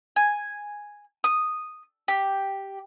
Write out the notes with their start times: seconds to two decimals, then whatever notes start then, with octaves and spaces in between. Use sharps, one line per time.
0.16 G#5
1.24 D#6
2.08 G4